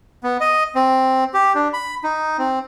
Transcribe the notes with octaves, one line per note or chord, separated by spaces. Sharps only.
B3
D#5
C4
G4
D4
B5
D#4
C4